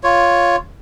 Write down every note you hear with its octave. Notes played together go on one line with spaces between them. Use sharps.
F4 C#5